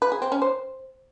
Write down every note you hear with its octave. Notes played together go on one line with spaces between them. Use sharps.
B4
G#4
C4
C#4
C5